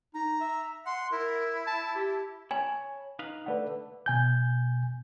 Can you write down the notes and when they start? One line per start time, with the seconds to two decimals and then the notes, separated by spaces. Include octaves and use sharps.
0.14 D#4 A#5
0.41 E5
0.86 F#5 C6
1.12 E4 A#4
1.67 A5
1.95 G4
2.51 C#5 G#5 A5 B5
3.19 D#4 B4 F5
3.46 D3 A3 B4 D5 F#5
4.06 B2 G#5 G6